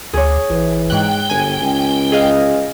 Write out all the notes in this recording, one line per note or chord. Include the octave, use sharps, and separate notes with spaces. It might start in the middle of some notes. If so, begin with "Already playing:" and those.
D2 G#4 C#5
A1 E3
G#2 G5 F#6
G1 G#5
C#2
G#4 D#5 F5